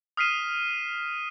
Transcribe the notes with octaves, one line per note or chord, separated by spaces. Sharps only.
D#6 F6 B6 C7 D#7 E7